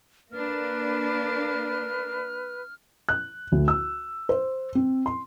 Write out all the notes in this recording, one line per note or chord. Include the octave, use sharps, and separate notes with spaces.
A#3 D4 B4 F6
F#6
D2
E6
C5
C4
C6